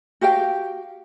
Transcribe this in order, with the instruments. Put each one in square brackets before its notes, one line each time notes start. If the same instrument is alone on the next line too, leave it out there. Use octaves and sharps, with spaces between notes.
[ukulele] F#4 G4 F5 G5